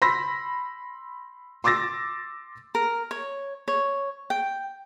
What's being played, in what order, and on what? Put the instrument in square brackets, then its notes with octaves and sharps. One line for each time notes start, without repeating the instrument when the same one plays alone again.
[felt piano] B5 C6 E6 A#6 B6
C6 D6 E6 A6 A#6
[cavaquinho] A#4
C#5
C#5
G5